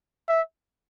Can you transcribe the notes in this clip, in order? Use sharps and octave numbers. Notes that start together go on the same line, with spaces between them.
E5